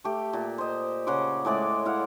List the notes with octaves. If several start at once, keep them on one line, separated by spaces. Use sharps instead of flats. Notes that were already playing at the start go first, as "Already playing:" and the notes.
A3 G4
A#2
C5 D#5
C#3 F#5 C6 D6
A2 G#3 D5 D6
E4 F5 F#5